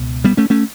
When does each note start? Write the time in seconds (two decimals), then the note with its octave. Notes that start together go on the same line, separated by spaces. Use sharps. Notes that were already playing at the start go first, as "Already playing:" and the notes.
Already playing: C#2 B2
0.24 G3 B3
0.37 A3 C#4
0.50 A3 C#4